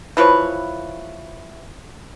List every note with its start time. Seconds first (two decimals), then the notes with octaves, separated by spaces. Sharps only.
0.17 E3 F3 B4 C#5